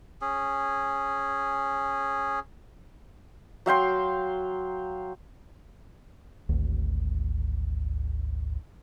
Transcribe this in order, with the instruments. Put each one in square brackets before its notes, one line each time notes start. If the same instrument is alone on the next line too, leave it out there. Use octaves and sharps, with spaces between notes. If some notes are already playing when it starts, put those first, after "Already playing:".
[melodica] C#4 G#4
[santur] F#3 F5 G5 C6
[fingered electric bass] G#1 D2